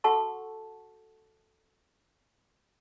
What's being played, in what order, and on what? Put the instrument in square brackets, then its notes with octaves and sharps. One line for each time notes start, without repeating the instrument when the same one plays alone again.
[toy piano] F#4 A4 F#5 A5 C#6 E6